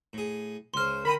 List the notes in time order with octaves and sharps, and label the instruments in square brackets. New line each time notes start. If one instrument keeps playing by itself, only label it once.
[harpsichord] A2 G#4
[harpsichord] C#2 C#3 C5 [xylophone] C6 F6
[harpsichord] D3 G5 D#6 [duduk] A#4 [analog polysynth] B5